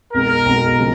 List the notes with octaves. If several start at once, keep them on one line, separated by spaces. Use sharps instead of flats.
B1 B2 G#3 A#4
B1 B2 G#3
C#3 F3 G#3